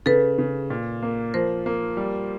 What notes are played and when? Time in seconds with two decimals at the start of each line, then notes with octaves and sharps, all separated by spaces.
0.06 C#3 A4 B4
0.38 C#3
0.70 A#2
1.02 A#3
1.34 F3 A#4 C5
1.66 A#3
1.97 G3